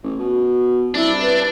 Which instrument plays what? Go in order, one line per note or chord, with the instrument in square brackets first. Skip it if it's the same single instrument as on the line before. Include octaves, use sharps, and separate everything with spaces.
[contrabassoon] A1
B2
[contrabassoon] C2 [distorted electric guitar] D4 [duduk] E4
[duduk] B4